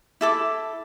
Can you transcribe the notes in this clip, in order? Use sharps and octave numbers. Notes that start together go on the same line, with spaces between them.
E4 A4 D6